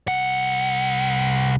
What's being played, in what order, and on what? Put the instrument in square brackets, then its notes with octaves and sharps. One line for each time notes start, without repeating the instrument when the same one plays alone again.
[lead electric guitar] C2 F#5